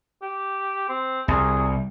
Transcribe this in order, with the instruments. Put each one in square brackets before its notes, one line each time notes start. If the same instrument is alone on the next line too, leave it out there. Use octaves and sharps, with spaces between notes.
[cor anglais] G4
C4
[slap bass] C2 [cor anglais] G#4